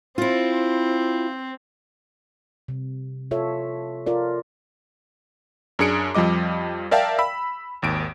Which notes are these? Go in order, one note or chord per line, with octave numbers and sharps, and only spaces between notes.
C4 E4 F4
C3
F4 A4 C#5 E5
F4 A#4 D5
F#2 D4 G#4 C#7 D7
F2 F3 G3 D#5 D6
A#4 D5 E5 F5 G5 A5
B5 E6
G#1 D#2 D7